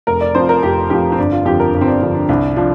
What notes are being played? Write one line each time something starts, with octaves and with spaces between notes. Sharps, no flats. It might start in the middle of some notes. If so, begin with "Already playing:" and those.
F1 A#4
D5
F2 F3 C5
A#4
F1 G4
F2 F3 G4
C4
G1 D4
F4
F2 D3 F3 G4
A#4
G1
C4
D4
F2 D3 F3
D4
C2 D4
F3 D4